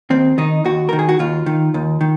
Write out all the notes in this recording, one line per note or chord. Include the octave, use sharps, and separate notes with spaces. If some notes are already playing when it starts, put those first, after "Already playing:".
D#2 C4
D#3 D#4
D#2 F#4
D#3 A#4
G#4
F#4
D#2 F4
D#3
D#2
D#3